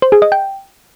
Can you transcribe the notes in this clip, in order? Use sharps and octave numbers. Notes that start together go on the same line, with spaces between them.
C5
G#4
D#5
G5